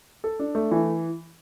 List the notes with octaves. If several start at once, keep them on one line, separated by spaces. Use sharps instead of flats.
A4
D4
A3
E3